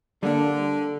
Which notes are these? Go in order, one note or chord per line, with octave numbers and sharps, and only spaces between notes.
D3 G3 A#3 D4